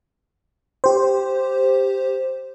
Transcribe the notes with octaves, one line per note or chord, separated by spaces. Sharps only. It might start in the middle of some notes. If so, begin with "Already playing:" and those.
G4 C5